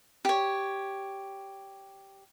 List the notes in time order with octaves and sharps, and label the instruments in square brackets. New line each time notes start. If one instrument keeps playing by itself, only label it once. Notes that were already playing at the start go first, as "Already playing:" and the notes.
[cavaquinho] G4 C#5